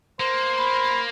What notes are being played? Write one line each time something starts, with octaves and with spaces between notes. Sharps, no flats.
A#3 C5
B5